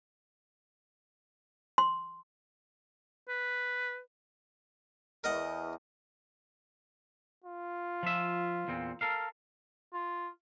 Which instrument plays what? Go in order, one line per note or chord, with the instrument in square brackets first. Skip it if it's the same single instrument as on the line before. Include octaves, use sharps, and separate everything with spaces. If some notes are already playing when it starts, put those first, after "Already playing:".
[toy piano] C6
[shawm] B4
[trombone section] E2 [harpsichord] A#4 D#5 F#5
[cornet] F4
[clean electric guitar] F3 E5
E2 A#2 C4
A4 A#4 F5
[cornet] F4